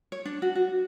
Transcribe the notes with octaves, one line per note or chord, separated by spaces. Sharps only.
C#5
D4
F#4
F#4